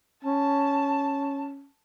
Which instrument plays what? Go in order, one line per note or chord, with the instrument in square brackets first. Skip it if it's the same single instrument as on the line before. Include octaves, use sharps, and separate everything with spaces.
[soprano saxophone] C#4 [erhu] A5